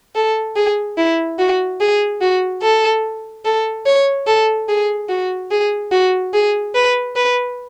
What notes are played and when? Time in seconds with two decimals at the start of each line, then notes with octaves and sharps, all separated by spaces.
0.16 A4
0.56 G#4
0.97 E4
1.39 F#4
1.80 G#4
2.21 F#4
2.63 A4
3.45 A4
3.86 C#5
4.27 A4
4.69 G#4
5.09 F#4
5.51 G#4
5.92 F#4
6.33 G#4
6.75 B4
7.16 B4